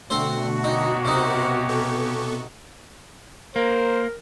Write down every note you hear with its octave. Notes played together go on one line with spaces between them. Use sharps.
B2 D3 A3 C4 F#4 C5
A#3 C#4 D#4 G4
C3 D#4 A#4 C5 F#5
B3 A4 C#6
A#3 A#4 C5